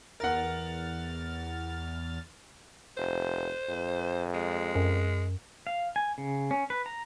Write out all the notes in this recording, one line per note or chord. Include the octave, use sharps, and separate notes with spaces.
E2 A#4 F#5 F6 A6
F1 C5
F2
G#3
F#2
F5
G#5
C#3
C#4
B4
A#5